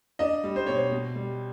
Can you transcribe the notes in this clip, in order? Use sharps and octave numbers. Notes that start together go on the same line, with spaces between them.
D4 D#5
G3
C5
B2 C#5
C5
B2
G3